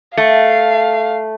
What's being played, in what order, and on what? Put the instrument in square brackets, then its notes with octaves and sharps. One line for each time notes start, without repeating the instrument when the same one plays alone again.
[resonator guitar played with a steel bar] A3 [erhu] F5